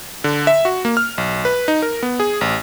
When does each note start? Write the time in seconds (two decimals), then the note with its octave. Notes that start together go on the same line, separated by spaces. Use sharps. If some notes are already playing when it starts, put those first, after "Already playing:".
0.24 D3
0.47 E5
0.65 F#4
0.85 A#3
0.97 F6
1.18 B1
1.45 B4
1.68 D#4
1.82 A#4
2.03 B3
2.20 G#4
2.41 A1